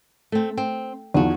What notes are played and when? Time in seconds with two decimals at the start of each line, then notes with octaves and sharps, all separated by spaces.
0.32 A3 C4
0.57 C4
1.14 E2 D#3 F3 F4 F#4